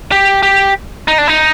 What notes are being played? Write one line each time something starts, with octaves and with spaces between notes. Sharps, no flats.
G4
G4
D#4
D4
D#4